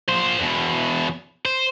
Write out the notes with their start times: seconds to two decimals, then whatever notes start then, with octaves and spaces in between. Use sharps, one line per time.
0.08 A#2 C5
0.39 E2 B2
1.45 C5